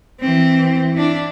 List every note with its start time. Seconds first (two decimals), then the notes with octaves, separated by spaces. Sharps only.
0.21 E3 C4
0.94 D4 E4